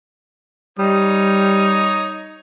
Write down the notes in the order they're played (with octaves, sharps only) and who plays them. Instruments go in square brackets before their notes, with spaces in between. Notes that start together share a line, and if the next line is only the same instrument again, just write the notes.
[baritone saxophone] G3 [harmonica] D#4 C#5 D#6